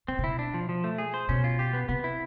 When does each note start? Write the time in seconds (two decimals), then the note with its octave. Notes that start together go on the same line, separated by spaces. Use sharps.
0.08 B2 C4
0.19 C3
0.24 B2 E4
0.39 D4
0.54 F3
0.69 F3
0.84 A3
0.98 G#4
1.14 C5
1.29 B2 C#4
1.44 F4
1.59 G4
1.73 B3
1.89 C3 B3
2.04 E4